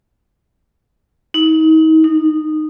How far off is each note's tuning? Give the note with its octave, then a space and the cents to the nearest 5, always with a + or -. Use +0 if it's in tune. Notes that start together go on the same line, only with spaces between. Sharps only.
D#4 +35
D#4 -15